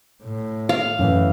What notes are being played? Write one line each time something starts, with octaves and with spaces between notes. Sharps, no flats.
A2
F5
F#2 A2 E3